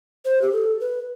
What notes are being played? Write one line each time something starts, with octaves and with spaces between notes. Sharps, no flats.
C5
G4
A4
B4